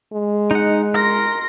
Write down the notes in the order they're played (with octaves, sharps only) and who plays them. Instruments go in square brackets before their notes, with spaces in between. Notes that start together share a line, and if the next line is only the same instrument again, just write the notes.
[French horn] G#3
[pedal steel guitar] D#4 F#5
[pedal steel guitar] A#4 [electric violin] C6 A#6